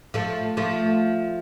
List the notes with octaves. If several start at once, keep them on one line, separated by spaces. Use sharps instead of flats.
F3 A3
F3 A3